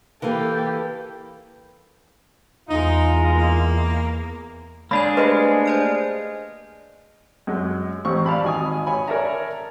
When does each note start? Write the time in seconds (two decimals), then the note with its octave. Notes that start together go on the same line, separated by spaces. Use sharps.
0.22 E3 A#3 G4 A4
2.69 E2 G#3 D#4 F4 A#5
3.36 A#3
4.91 G#3 A#3 D4 G#4 D5 B5 G#6
5.17 G#3 A3 G4 B4 C5
5.66 C5 D5 F6
7.47 F#2 G#3
8.05 A1 C4 C#6
8.26 D5 F5 A5 B5
8.44 G#1 G#5 D#6
8.86 C#5 G#5 B5
9.07 A#4 C#5 D5 E5 A5 A#5